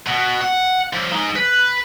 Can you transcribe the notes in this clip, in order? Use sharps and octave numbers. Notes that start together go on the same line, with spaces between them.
B2
F#5
D3 F3
G#3 D#4
B4